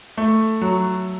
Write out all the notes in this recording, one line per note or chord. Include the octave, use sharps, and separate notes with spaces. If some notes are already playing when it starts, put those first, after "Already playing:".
A3
F#3